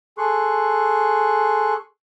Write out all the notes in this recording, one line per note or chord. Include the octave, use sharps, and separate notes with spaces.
G#4 A4 C6 C#6 F#6